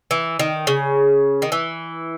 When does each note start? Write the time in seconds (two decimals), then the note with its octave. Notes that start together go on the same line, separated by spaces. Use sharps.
0.11 E3
0.39 D#3
0.67 C#3
1.42 D#3
1.52 E3